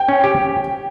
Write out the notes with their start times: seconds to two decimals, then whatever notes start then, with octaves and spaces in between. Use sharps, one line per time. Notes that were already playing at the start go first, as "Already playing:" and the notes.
Already playing: G5
0.08 C#4
0.24 G4